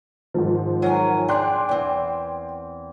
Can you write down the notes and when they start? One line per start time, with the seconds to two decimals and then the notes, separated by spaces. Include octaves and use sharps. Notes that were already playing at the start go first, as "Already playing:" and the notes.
0.34 G#2 D#3 F3
0.82 F#3 A#4 G#5
1.29 D4 G#4 G5 C6 F#6
1.69 E2 C4